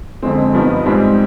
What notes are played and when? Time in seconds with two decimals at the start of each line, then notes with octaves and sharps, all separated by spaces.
0.22 F2 D3 G#3 C4
0.53 G2 F3 B3 D#4
0.85 G#2 G3 C4 D#4